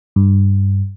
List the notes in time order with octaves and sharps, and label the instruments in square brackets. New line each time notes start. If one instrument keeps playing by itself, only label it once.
[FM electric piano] G2